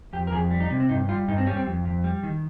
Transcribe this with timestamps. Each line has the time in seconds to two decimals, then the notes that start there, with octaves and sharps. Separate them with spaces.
0.13 F2 G4
0.27 A#4
0.32 F2 G#4
0.51 G3
0.60 D#4
0.70 C3
0.80 C4
0.89 G2 D#4
1.09 G3 F4
1.28 G2 D#4
1.38 C4
1.47 G3 C#4
1.57 C4
1.67 F2
1.85 F2
2.04 G3
2.23 D#3